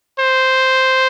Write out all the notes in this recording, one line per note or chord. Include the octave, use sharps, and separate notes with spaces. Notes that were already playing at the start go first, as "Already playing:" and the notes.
C5